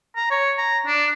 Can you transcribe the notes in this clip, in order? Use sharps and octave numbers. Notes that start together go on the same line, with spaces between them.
A#5
C#5
A#5
D4